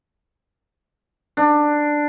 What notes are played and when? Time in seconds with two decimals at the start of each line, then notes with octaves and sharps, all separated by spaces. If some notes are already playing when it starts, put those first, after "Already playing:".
1.37 D4